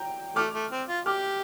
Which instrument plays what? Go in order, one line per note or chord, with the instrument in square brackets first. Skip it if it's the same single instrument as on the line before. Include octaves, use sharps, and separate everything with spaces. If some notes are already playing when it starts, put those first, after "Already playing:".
Already playing: [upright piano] G5 A#5
[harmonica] A3 [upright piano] D6 F6
[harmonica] A3
C4
F4
[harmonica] G4 [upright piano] D6 F6